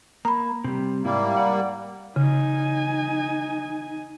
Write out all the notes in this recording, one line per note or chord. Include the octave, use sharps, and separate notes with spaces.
A#3 A#5 B5
C3 G3
G#2 G3 A#3 E4
D5 F#5
C#3 D#4 G#5